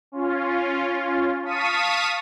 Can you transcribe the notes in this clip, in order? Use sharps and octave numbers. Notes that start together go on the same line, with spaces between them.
C#4 F4
F5 A5 C#6 D#6 B6 D#7